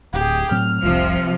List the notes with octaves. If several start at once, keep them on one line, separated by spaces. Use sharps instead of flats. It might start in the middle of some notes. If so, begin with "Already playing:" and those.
D1 G4 G#4
A2 F#3 C4 F6
F1 C2 C3 F3